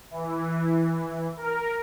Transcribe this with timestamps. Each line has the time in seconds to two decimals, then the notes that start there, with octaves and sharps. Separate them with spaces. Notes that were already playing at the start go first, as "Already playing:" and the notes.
0.11 E3
1.37 A#4